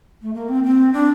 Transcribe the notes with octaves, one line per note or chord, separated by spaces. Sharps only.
A3
A#3
C4
C4
D4